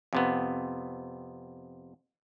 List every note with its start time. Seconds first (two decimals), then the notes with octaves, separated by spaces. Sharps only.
0.13 F2 C3 B3